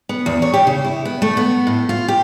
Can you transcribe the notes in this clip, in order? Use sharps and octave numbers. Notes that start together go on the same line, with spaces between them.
B3
E2
C#5
G4
C#3
E4
B3
A3
B3
A2
F4
G4